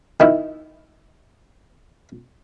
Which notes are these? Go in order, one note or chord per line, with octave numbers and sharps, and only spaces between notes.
D#3 E4